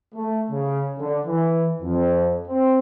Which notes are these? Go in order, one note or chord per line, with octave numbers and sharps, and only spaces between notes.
A3
C#3
D3
E3
F2
C4